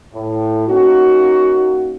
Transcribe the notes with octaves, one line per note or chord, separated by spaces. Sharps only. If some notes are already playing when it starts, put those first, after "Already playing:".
A2
A#3 C#4 D#4 F#4